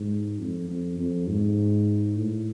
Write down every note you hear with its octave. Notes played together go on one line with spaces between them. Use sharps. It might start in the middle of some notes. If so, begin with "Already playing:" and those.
Already playing: G#2
F2
F2
F2
G#2
A2